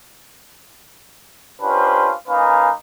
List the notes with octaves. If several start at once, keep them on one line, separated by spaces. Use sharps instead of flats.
C#4 D4 F4 G4 B4 C5
A#3 C#4 D#4 B4 F5 G#5